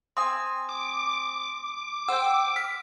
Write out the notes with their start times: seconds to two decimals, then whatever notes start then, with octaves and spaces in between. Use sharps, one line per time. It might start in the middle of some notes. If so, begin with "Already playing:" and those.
0.17 C4 G#5 C6 D#6
0.69 D6
2.08 C5 F#5 G5 E6
2.56 F6 B6